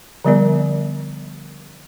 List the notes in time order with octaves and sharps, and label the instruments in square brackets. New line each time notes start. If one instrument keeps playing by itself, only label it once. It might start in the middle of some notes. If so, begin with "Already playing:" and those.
[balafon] D3 F3 G3 B3 A#4 D5